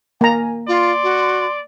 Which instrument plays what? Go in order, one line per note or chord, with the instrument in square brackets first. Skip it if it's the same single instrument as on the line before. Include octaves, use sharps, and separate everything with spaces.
[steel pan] A#3 A#5 [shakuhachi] G#5
[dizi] F4 [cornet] D5 [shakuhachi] C6
[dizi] F#4